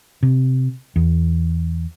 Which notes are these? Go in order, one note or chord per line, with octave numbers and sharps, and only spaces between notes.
C3
E2